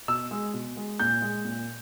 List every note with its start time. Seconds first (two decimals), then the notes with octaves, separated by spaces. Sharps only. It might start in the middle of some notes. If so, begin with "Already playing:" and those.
0.08 B2 E6
0.31 G#3
0.54 B2
0.77 G#3
1.00 A#2 G6
1.22 G#3
1.45 A#2